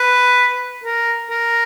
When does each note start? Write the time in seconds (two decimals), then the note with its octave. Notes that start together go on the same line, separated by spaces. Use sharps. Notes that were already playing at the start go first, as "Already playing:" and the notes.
Already playing: B4
0.84 A#4
1.30 A#4